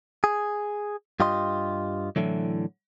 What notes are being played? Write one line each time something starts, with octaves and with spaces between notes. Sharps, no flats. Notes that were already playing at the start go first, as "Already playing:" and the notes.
G#4
G2 F4 G4 D#5 C6
A2 D3 E3 F#3